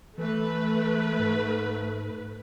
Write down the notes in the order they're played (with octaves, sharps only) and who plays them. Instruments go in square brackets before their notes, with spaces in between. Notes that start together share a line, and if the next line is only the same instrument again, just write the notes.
[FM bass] E3 [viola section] A3 B4
[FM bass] G#2